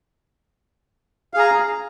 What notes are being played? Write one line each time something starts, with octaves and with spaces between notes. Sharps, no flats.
G#4 F5 A#5